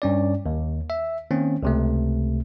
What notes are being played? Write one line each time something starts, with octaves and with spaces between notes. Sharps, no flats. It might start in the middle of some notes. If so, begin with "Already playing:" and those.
G2 C#4 D5
D#2
E5
D#3 A#3 C4 C#4
C#2 C3 A3